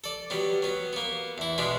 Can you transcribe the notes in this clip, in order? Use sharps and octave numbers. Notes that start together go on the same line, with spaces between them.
A4 D5
F#3 G3 B3
F#3 B3
A#3 B3
E2 E4
B2 G#3 B3 D4